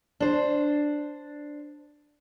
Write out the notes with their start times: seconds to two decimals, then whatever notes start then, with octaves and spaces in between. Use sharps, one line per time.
0.20 D4 C5